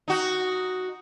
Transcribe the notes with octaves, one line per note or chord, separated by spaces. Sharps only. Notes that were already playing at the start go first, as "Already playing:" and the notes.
D#4 F#4